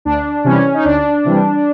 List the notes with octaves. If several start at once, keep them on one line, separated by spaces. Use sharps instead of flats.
D2 D4
C3 E3 G3 C#4
D#4
D2 D4
C3 E3 G3